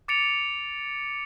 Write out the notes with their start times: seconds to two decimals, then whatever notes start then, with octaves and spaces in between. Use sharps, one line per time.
0.08 D6 A6 C#7 D7 F7